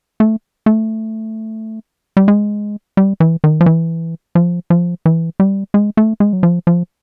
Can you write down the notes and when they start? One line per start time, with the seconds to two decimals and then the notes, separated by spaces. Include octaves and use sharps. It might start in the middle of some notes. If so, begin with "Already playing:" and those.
0.20 A3
0.66 A3
2.17 G3
2.28 G#3
2.97 G3
3.20 E3
3.44 D#3
3.61 F3
3.66 E3
4.35 F3
4.70 F3
5.06 E3
5.40 G3
5.74 G#3
5.97 A3
6.20 G#3
6.33 F#3
6.43 F3
6.67 F3